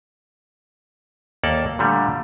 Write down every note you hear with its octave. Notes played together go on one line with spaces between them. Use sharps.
D#2 A#3 A4 D5
A#2 D3 G3 A3